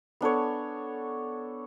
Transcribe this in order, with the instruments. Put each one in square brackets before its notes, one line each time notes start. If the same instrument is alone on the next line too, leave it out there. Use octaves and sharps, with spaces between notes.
[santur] B3 D4 A4 C#5